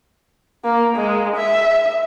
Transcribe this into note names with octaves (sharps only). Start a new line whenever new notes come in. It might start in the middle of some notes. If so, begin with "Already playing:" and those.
A#3
G#3
E5